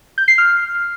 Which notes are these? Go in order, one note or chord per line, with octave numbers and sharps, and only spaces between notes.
G6
C7
F6